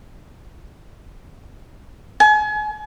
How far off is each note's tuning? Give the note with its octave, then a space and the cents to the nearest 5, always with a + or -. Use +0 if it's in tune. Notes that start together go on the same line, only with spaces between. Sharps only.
G#5 +35